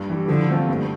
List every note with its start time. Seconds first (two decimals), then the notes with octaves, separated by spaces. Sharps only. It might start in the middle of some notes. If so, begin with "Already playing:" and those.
Already playing: G2
0.09 E3 G3
0.28 D3 F3
0.49 A3 C4 F4
0.69 G2